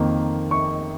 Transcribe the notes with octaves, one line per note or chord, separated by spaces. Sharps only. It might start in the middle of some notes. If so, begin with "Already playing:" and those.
Already playing: F2 D#3 A#3
C#6